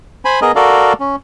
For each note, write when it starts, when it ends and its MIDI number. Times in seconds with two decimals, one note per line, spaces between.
0.25 0.40 72
0.25 0.40 80
0.25 0.40 83
0.42 0.52 59
0.42 0.52 68
0.42 0.52 70
0.42 0.52 75
0.56 0.93 66
0.56 0.93 69
0.56 0.93 70
0.56 0.93 74
0.56 0.93 77
1.00 1.16 61